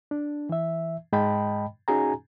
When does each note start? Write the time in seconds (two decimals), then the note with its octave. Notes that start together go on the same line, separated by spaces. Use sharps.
0.11 D4
0.49 E3 E5
1.13 G#2 G#3 D#5 G5 A5 B5
1.88 C#4 D#4 F#4 G#4 G#5 A#5